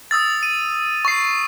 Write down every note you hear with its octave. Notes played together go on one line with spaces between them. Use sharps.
D#6 E6 A6
D#7
C#6 C7